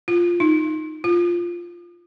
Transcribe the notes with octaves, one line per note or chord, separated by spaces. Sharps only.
F4
D#4
F4